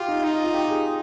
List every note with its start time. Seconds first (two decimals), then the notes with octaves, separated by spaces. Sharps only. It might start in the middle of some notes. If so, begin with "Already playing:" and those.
Already playing: F4 G4
0.08 D#4
0.23 D#4
0.33 F4
0.44 F4
0.54 G4
0.68 G#4